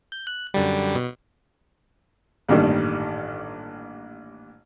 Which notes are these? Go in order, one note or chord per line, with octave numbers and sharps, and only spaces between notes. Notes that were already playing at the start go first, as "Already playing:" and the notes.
G6
F#6
F#2 D3 G3
B2
A1 G2 A#2 D#3 G3 A4